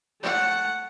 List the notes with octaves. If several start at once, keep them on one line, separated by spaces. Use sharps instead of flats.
A3 F#5